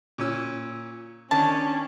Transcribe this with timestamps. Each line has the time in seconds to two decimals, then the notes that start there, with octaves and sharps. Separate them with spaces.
0.18 A#2 C#4 E6
1.31 D#3 C#4 D4 A5